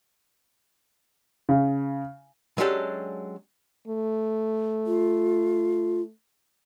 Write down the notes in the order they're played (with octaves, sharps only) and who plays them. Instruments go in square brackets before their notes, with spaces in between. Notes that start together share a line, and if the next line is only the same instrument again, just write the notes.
[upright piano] C#3
[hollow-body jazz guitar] F#3 G#3 C#4 D4 G4 A4
[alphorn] A3
[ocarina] F4